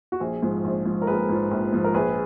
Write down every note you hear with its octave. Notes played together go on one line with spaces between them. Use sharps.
F#4
A#1 G#4
G#2 F3
A#1
G#2 F3
A#4
A#1 G#4 B4
G#2 F3
A#1
G#2 F3
A#4
A#1 G#4 B4